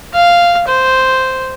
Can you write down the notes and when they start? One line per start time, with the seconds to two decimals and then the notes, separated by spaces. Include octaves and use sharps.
0.14 F5
0.68 C5